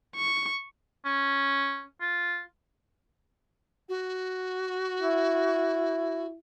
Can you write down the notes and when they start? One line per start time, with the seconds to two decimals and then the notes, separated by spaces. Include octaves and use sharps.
0.16 C#6
1.05 C#4
2.01 F4
3.89 F#4
5.00 E4